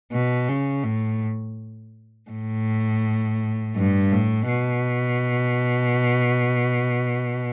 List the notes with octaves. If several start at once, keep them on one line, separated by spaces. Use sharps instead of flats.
B2
C#3
A2
A2
G2
A2
B2